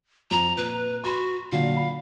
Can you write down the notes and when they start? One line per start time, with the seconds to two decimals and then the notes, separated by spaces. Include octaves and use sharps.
0.31 F2 A#5
0.57 A#2 B4
1.04 F#4 B5 C6
1.52 A#2 D3 F#3 F5
1.77 B5